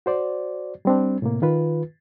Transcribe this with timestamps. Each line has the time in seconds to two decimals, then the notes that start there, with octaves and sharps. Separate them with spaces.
0.06 F#4 C5 D5
0.85 G3 C4 D4
1.22 A2 C3 A#3
1.42 D#3 F4 B4